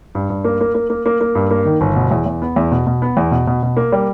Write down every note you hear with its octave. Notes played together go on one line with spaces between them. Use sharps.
G2
G2
A#3
A#3
A#3
A#3
A#3
A#3
G2
A#3
D#3
G1
B2
E2
E2
B3
E2
B2
B2
B3
E2
B2
B2
B2
A#3
G3